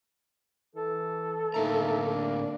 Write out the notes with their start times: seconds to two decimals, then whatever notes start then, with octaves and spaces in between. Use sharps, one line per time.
0.75 E3 A4
1.54 A2 D3 A#3 D#4 E5 A#5
2.10 D4